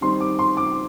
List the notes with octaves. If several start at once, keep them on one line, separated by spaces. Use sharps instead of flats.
D#3 G3 C4 D#4 C6
D6
C6
D6